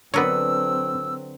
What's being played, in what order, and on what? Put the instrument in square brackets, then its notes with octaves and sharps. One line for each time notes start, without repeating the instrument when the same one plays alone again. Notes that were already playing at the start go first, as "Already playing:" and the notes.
[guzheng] D3 B4 [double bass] F#3 C4 [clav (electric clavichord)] B3 A#4 C#5 [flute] E6